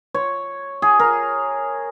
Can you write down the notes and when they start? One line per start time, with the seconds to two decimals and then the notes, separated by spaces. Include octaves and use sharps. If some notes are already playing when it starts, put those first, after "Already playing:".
0.14 C#5
0.82 G#4
1.00 A#4